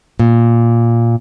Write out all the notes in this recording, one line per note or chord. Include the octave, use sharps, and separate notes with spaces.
A#2